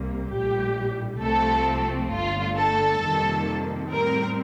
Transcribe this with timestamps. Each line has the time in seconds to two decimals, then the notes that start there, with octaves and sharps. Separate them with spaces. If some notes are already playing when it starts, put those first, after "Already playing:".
Already playing: C2 C3 G3 A#3
0.31 A#1 A2 G3 G4
1.21 C2 C3 F3 A3 C4 A4
2.12 G1 G2 D3 A3 F4
2.57 A4
3.01 F2 C3 D#3 G3 A#3
3.90 A2 G3 C4 A#4